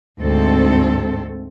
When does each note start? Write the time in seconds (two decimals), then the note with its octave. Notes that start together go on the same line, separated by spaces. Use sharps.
0.21 D2 G#2 A3 C4 A4